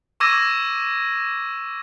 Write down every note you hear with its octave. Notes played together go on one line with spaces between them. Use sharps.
C#6 D6 E6 G#6 A#6 D#7